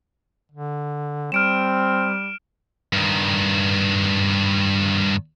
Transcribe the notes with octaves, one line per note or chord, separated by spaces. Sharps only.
D3
G3 C4 F6 D7 E7
G2 D#3